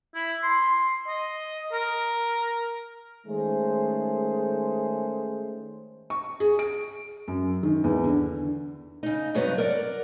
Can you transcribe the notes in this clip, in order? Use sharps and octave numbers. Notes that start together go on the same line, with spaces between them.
E4
C6
D#5
A#4
D#3 G#3 A3 C#4 G#4 C5
C#6
G#4
D7
F#2
D#3
E2
D3
C#3 D#4
G2 C3 F#3 B3 D#4
A#4 D5 F#5